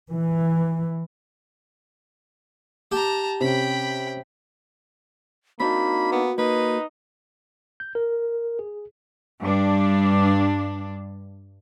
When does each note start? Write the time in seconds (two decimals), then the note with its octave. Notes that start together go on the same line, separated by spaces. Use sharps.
0.11 E3
2.92 G4 A5 A#5
3.40 C3 C#4 G5 B5
5.60 A#3 C4 D4 D#4 F#4 B5
6.12 B3
6.38 A#3 D#4 B4
7.80 G6
7.95 A#4
8.59 G#4
9.41 G2 D4